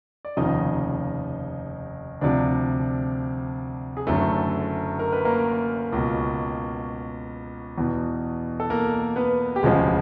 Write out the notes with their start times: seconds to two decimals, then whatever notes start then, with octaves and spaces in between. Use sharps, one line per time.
0.25 D5
0.37 F1 D#2 C#3 F3 D#4 D#5
2.21 D2 C3 F3 D4 D5
3.97 G#4
4.07 F#1 F#2 D3 A3 A4
4.99 A#4
5.12 B4
5.25 A#3 A#4
5.92 C#2 B2
7.78 E2 B2
8.60 A4
8.70 A#3 A#4
9.16 B3 B4
9.56 G4
9.63 E1 D2 C#3 F3 G#3 G#4